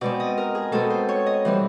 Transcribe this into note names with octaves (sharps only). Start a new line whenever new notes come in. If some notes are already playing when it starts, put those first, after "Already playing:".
B2 G#3 C4 D5
D#5
A#4
G#4
B2 G#3 C4 A4
C5
C#5
D#5
E3 G3 C4